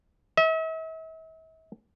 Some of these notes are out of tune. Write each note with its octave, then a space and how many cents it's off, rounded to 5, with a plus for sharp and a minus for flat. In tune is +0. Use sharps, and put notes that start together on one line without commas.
E5 -45